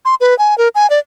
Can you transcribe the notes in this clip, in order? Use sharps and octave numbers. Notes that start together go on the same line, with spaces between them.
C6
B4
G#5
A#4
G#5
D5